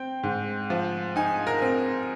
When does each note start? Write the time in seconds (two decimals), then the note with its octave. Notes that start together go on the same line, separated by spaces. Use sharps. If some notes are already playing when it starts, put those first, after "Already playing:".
Already playing: C4 G5
0.23 G#2
0.70 F3
1.16 D#4 G#5
1.47 A#4
1.62 C4